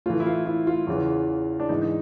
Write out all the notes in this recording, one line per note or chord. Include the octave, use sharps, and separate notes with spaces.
A2 E3 F4
E4
F4
E4
F4
E2 C#3 E3
D4
G#2 E3 D#4
D#4